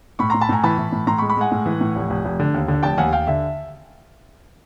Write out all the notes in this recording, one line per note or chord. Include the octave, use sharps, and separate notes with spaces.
A2 B5 C#6
A2 A#5 C6
A5 B5
A2 G#5 A#5
E3 A5 B5
E3
A2
A2 A#5 C6
B5 C#6
G#3
B5 C#6
G#3 F#5 G#5
A2
E3
A2
F1
F1
F1
D3
D#2
D3
F1 G5 A5
D#2 F#5 G#5
D#2 F5 G5
D3 E5